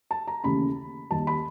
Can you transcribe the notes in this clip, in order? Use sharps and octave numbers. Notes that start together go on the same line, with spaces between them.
A5
A#5
D#2 C#3 E3 A3 C#4 B5
D#2 D#3 G3 A5
B5